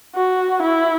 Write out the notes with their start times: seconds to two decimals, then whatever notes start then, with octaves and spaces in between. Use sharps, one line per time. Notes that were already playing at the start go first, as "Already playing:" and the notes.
0.15 F#4
0.63 E4